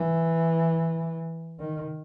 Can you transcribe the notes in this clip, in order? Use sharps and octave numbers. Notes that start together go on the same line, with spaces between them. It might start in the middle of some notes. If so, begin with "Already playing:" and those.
Already playing: E3
D#3